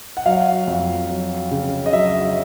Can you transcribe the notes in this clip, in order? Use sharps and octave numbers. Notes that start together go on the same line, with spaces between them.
F#5
F#3 F5
F2
F#3
C#3
D#5
F#3 E5